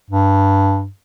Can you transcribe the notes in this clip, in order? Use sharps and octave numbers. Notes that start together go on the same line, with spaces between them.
G2